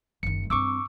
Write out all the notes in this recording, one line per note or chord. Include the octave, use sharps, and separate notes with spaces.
F#1 D#3 C#7
G2 C4 C#6 D6 E6